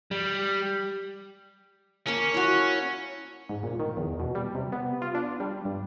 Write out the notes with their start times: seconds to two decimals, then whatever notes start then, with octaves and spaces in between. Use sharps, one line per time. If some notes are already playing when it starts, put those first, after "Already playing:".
0.11 G3
2.07 A#3 C#4 A5
2.34 E4 F#4
3.49 G#2
3.63 A#2
3.80 D#3
3.97 E2
4.20 B2
4.35 G3
4.55 C3
4.72 B3
5.02 F4
5.15 D4
5.40 G3
5.65 G2